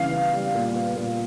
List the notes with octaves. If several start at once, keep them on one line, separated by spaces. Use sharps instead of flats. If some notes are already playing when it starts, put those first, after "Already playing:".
Already playing: C#3 E3 G3 F5
B3
G3
A#2
B3
A#2